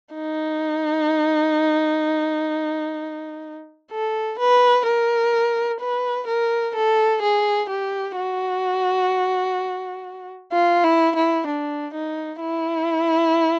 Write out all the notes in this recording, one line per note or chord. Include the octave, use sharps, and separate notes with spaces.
D#4
A4
B4
A#4
B4
A#4
A4
G#4
G4
F#4
F4
E4
E4
D4
D#4
E4